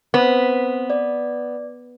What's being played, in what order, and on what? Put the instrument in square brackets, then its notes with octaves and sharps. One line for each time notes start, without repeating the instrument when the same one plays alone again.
[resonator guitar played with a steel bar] B3 [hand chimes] C4 C5 B6
[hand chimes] D5